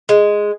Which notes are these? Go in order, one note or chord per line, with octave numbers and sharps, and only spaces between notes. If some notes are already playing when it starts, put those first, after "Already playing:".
G#3